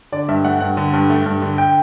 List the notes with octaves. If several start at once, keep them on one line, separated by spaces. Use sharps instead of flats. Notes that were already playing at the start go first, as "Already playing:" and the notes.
D3 D5
G2 E5
A3 F#5
G2 F#5
D3
G2
A3
G2
D3
G5